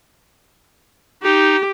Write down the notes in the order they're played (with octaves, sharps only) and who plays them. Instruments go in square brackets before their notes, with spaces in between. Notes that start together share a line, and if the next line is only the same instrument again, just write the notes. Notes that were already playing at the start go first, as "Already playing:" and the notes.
[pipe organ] D#4 [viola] G4